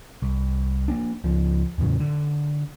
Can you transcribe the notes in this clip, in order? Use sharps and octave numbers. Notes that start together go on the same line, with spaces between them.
C2
A#3 C4 D4
C#2 F3
E2 A2 C#3 F#3
D3